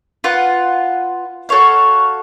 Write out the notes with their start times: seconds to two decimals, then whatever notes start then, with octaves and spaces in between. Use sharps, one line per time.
0.24 F4 B4 F#5
1.49 F#4 A4 C#5 F5